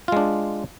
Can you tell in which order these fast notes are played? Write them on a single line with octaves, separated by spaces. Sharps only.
F4 G#3 D4